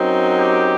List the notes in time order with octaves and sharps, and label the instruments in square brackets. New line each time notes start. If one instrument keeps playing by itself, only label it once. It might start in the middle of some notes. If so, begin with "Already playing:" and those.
Already playing: [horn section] F#2 F#3 C4 D#4
G4